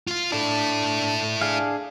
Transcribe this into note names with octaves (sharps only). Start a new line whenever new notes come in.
F4 F5
D4 E4 A4
D4 G#4 F5